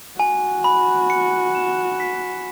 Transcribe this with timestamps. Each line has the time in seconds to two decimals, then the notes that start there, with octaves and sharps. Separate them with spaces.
0.20 F#4 G#5
0.64 B5
1.10 C#7
1.55 E7
2.00 B6